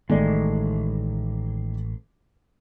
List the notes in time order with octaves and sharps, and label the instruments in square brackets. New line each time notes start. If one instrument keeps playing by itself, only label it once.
[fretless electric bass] A1 G#3 [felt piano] D#3 A3 D5